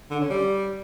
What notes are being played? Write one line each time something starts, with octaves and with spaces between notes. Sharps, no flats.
D3
C#4
G3